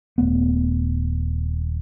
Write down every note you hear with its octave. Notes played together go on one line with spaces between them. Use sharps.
D#1 A3 B3